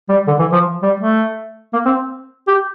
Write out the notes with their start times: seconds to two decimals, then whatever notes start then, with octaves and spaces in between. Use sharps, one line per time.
0.09 G3
0.27 D3
0.39 E3
0.52 F3
0.83 G3
1.00 A3
1.73 A#3
1.86 C4
2.48 G4